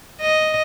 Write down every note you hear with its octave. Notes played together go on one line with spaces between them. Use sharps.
D#5